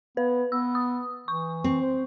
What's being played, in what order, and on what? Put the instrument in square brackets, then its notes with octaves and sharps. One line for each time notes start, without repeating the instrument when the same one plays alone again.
[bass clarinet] B3 [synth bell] B4
[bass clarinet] B3 [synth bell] E6
[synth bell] D#6
[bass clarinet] E3 [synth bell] C#6
[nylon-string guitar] C4
[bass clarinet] C5